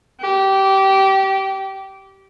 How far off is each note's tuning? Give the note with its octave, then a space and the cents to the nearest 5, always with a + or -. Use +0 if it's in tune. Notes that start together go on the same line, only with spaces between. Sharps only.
G4 -20